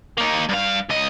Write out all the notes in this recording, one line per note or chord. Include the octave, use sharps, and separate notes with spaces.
A#3 D#4
G2 F5
C#2 D#5